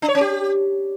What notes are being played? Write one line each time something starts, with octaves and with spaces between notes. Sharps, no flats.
D4
C#5
C#4
G4